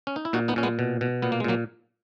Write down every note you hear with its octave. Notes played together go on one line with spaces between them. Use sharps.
C#4
D#4
E4
A#2 D#4 F#4
B3 D#4
A#2 C#4
G#3 B3
B2
B2
A#2 B3
A#3
G#3
A#2 F#3 A#3